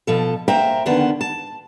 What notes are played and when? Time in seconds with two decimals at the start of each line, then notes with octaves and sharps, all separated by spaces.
0.07 B2 F3 A4
0.48 A#3 C5 E5 G5 A#5
0.85 F2 D3 D#3 B3 A5
1.21 A5